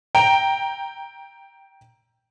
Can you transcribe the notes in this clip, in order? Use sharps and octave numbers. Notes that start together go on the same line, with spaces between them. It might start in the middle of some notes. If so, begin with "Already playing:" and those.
G5 A#5